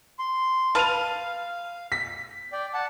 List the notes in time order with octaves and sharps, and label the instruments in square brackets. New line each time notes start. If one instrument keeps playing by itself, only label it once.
[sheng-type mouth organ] C6
[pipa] B4 A5 [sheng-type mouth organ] F5 [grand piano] F6 D#7 F7
[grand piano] B6
[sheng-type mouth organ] D5 G5
F#5 A5